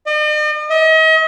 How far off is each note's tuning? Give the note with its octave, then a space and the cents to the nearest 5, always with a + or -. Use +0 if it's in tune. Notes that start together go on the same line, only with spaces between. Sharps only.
D#5 -45
D#5 +40